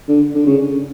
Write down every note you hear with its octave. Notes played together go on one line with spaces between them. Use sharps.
D3
D3
C#3